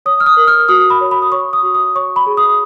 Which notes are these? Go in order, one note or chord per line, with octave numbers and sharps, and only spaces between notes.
C#5 D#6
F6
D#6
A#4
F6
F#4 D#6
B5
C#5
B5
D#6
C#5 C#6
D#6
F#4
D#6
C#5 C#6
B5
G#4
D#6